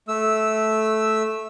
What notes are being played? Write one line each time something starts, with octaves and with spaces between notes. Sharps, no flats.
A3 E6